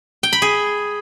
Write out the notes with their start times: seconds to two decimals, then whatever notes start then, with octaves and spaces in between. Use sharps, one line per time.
0.23 G5
0.33 B5
0.42 G#4